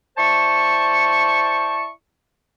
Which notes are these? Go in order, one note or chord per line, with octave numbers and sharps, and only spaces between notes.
E4 C5 D5 A5 C#6